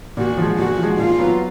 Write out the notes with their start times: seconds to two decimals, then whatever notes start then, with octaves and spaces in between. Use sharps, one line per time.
0.17 A#2 F#4
0.38 F3 G#3
0.58 A#2 F#4
0.78 F3
0.83 G#3
0.98 A#2 F4
1.19 F#3 B3